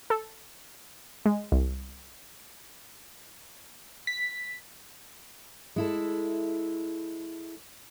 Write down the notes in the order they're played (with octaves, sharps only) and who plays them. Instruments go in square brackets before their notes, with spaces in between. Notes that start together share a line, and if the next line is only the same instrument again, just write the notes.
[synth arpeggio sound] A4
G#3
C2
[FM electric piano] B6
[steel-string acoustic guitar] G#3 E4 A4